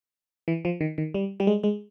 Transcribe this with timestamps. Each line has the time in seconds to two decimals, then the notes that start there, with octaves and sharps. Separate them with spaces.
0.48 E3
0.65 F3
0.81 D#3
0.98 D#3
1.14 G3
1.40 G3
1.47 G#3
1.64 G#3